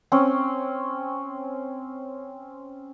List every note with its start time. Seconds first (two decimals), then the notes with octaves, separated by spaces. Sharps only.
0.12 C4 C#4